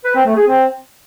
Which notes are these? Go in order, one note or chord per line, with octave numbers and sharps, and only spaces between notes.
B4
C4
A3
G#4
C4